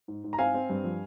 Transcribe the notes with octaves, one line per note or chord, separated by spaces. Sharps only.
G#2
G#2
A#5
C4 F5 G#5
C4
G2
F3